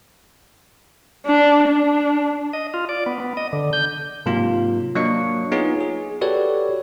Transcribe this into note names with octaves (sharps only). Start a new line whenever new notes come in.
D4
D4
D#5
F4
D5
B3
B3
D#5
D3
G6
G#2 C3 F#3 A#3 F4
F#3 A#3 D4 D#5 C#6 C#7
B3 D#4 F4 G#4 C#5
G#4
F#4 G4 A4 B4 C#5 D5